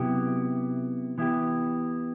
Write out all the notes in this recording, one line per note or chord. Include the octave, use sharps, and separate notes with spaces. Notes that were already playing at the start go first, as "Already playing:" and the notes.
Already playing: C3 F#3 B3 E4 G4
E3 B3 E4 G4